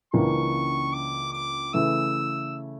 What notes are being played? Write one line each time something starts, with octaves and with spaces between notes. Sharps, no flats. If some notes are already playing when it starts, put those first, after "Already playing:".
C#2 C#3 E3 A#3 D4 C#6
D6
D6
C#3 E3 A3 E6